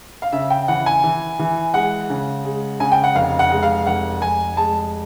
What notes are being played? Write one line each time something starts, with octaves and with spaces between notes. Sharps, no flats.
F5
C#3 E5
G5
E3 F#5
G#5
E3
E3
G#3 F#5
C#3
G#3
C#3 G#5
G5
F#5
F1 F5
F#5
G#3
F5
F1 F#5
F1 G#5
G#3 A5